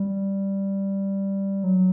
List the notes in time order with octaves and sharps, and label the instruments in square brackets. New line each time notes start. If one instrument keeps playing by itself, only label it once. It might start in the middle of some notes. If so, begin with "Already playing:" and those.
Already playing: [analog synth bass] G3
F#3